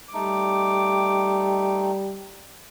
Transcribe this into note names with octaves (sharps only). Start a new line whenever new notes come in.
G3 A3 D#4 D6